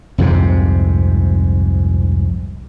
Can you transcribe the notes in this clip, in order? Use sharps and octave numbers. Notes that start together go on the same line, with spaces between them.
C2 F2 G#2 C3